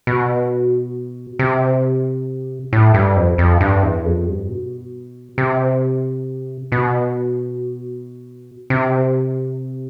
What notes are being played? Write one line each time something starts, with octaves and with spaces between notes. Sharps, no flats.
B2
C3
A2
G2
F2
F2
G2
E2
F2
G2
B2
C3
B2
C3